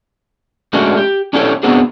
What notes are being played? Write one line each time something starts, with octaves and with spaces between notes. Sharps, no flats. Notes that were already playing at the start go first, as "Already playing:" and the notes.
G#3 A3 C#4 D4 F#4
G4
C#4 D4 E4 G4 A4 C#5
B3 C4 D4 F#4 G#4